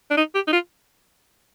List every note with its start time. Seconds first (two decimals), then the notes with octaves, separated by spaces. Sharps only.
0.10 D4
0.17 D#4
0.35 G4
0.47 D#4
0.52 F4